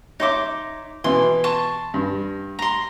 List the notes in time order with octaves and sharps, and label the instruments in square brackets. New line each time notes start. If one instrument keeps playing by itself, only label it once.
[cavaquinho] D#4 C6 D6 [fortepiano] C#5 E5
[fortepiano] B2 E3 [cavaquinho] C6
[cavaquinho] A5 C6 C#6
[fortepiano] G2
[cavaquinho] A#5 C6